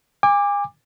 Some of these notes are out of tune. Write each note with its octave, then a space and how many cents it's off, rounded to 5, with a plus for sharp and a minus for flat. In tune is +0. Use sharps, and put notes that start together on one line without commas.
G#5 -35 D6 +5